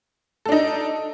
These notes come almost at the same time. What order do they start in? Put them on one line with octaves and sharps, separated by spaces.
A4 D4 D#4